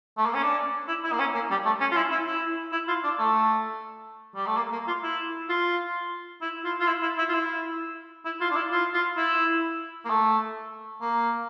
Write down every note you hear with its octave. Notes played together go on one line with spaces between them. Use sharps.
A3
A#3
C#4
D4
E4
E4
A#3
C#4
A#3
G3
A3
C#4
F4
E4
E4
E4
E4
F4
D4
A3
G3
A3
A#3
A#3
F4
E4
F4
E4
F4
F4
E4
E4
E4
F4
E4
E4
F4
D4
E4
F4
F4
E4
A#3
A3
A#3